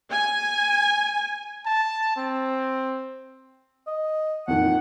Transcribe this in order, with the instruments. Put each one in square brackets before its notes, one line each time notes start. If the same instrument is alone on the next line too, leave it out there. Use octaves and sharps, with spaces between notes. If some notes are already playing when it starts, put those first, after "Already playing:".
[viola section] G#5
[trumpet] A5
C4
[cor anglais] D#5
[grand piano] F2 A#2 D#3 [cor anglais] F#5